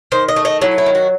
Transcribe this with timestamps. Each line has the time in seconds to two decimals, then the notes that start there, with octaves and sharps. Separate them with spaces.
0.12 D#3 C5
0.28 D#5
0.36 A3
0.45 D#5
0.61 F#3 E4
0.78 E4
0.86 D#3
0.95 F#4